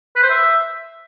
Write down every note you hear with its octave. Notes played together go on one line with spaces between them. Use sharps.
B4
C5
E5